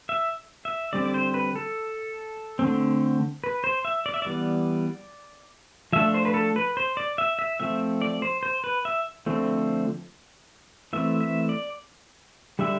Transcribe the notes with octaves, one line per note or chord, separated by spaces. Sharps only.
E5
E5
D3 G3 C4 D5
D5
C5
B4
A4
D3 A3 C4
B4
C5
E5
D5
E5
E3 G3 B3 D5
F3 A3 D4 E5
C5
B4
A4
B4
C5
D5
E5
E5
F3 A3 C4 E5
D5
C5
C5
B4
E5
D3 F3 A3 C4
E3 A3 C4 E5
E5
D5
D3 G3 D4 E5